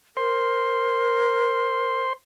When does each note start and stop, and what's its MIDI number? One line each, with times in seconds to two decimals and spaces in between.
0.17 2.02 70
0.17 2.13 72
0.17 2.13 84